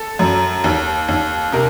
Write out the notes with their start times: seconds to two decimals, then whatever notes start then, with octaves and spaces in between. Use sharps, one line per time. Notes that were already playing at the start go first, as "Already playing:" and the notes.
Already playing: A4
0.19 F#2
0.64 D#2
1.08 D#2
1.52 C3 A#4